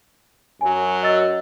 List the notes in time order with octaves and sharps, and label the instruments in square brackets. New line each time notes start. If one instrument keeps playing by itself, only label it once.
[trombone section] F#2 F#3 [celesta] G#5
[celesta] D#5 E6 A6